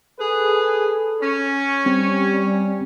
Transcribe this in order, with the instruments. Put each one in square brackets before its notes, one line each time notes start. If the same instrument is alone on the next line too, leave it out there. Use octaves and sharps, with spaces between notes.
[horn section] G#4 B4 [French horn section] A4
[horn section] C#4
[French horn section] G3 [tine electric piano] C4